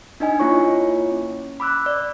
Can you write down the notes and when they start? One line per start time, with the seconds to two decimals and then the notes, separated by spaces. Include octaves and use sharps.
0.20 D4 D#4 D#5 G#5
0.39 A#3 E4 F4 C#5 C#6
1.11 C#4
1.60 B5 D6 E6 F#6
1.86 D5